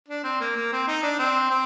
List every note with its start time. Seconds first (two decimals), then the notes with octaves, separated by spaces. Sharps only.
0.08 D4
0.24 C4
0.40 A#3
0.56 A#3
0.72 C4
0.87 D#4
1.03 D4
1.19 C4
1.51 C4